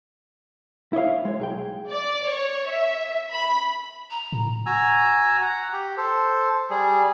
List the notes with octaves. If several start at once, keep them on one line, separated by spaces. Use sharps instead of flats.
E4 C#5 D#5 F5
G#3 C#5
B1 G#4 G5
D5
C#5
E5
B5
A#5
A2
F#4 G#5 A#5 E6
F#5 A#5
G4
A4 C5
G3 G#4